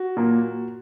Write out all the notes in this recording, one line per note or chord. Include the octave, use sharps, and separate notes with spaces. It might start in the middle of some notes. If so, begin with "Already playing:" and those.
Already playing: F#4
A#2 F#3 A#3